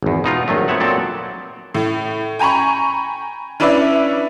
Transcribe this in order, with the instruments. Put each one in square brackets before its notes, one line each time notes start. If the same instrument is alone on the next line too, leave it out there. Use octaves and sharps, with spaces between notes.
[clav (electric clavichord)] G#1 E2
B2 D#4 F4
A#1 D#3 F#3 A3
B3 C4 C#5 E5 F#5
A#2 F#3 C4 A4 D5
[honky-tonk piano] A2
G5 G#5 A#5 B5 C#6
C#4 D4 E4 B4 D5 E5